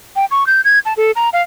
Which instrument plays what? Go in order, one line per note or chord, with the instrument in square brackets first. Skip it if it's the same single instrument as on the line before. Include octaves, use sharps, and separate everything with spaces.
[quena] G5
C#6
G6
G#6
A5
A4
A#5
F5